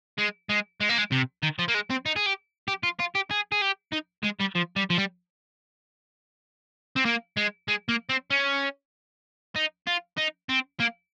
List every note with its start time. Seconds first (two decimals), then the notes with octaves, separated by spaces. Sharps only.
0.18 G#3
0.49 G#3
0.80 G#3
0.89 A#3
0.98 G#3
1.12 C3
1.43 D#3
1.59 F3
1.68 A#3
1.74 G#3
1.90 C4
2.06 D#4
2.16 G#4
2.26 G4
2.68 G4
2.83 F4
2.99 F4
3.15 G4
3.31 G#4
3.52 G#4
3.62 G4
3.93 D#4
4.24 G#3
4.40 G3
4.55 F3
4.76 G3
4.90 F3
4.98 G3
6.96 C4
7.05 A#3
7.37 G#3
7.68 G#3
7.89 A#3
8.09 C4
8.30 C#4
9.56 D#4
9.87 F4
10.17 D#4
10.49 C4
10.80 A#3